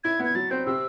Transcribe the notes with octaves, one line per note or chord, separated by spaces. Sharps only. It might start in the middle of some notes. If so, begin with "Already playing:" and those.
E4 G#6
B3
G#6
F#3 A6
C4 G6
C3 E6